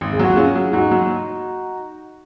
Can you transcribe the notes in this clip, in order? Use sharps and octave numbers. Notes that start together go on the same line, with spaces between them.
G#1
G#4
F#3 F#4
C#4 F4 G#4
F#3
G#2 D#4 F#4
F#3